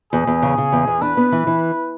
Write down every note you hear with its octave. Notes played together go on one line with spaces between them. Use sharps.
E2 G#4
E2
C#3
C#3
E2
E2
D4 B4
B3
E3
E3